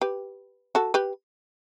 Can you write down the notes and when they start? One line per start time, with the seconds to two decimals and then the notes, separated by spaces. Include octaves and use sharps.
0.02 G4 B4
0.75 F#4 A4
0.94 G4 B4